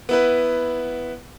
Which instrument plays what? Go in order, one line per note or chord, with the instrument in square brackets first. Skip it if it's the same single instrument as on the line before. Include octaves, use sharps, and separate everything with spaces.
[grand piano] B3 E4 B4